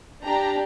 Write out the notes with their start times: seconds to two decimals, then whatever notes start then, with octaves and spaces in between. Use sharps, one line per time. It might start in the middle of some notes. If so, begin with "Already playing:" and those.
0.24 D4 G4 A#5